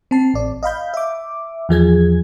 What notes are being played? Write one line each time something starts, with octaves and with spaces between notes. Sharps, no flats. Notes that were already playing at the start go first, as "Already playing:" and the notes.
C4 A5 C7
A1 D5
D#5 F5 B5 G6
E5 D6
E2 F3 G#4 G#6